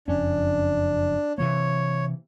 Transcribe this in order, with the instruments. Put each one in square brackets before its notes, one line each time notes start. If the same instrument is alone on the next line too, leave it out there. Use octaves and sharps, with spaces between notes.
[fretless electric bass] F#1 F2 C#4 [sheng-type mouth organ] D4
[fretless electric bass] C3 E3 A#3 [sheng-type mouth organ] C#5